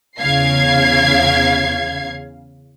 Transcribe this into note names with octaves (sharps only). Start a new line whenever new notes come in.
E2 C#3 F5 G#6 C7